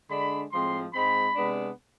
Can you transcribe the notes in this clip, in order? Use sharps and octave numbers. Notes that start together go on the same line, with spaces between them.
D3 G#3 D4 B5
A2 F3 G#3 C4 C6
G#2 G#3 C4 B5
C3 G#3 B3 D4